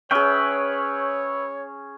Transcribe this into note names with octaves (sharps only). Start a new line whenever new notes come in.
C#4 G#4 B4 C#5 E5 G5